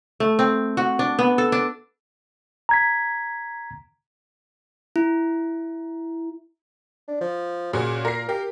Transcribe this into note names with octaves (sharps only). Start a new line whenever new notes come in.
A3
C4
F#4
D4
B3
A4
D4
A#5 G#6 B6
E4
D4
F3
A#2 C#3 F#4
A#2 A#4 C7
G4 A#4